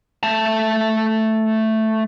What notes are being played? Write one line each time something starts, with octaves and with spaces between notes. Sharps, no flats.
A3 A5